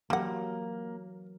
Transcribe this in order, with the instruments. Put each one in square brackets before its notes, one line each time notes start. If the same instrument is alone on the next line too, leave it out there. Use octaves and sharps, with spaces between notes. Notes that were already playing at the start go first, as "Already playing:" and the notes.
[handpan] E3 F#3 A#4 [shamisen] G3 F#5 [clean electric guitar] A#3